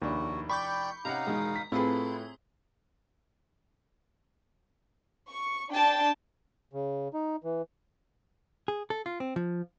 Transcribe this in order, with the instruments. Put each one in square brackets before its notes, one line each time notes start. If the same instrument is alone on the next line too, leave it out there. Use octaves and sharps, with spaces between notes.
[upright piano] F1 D4 E4 [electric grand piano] D#2 [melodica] F#4
[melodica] D5 G5 [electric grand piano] B5 [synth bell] C#6 D6 G6
[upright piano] C3 C#4 F#5 [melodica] D#4 F5 [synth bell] A#5
[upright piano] E1 D#3 [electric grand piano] G#3
[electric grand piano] B6
[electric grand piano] A2 [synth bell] C4 G#4 [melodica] E4 [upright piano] F4 A4 B4
[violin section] C#6
D4 G5 A5
[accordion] C#3
D#4
E3
[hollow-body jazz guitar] G#4
A4
F4
C4
F3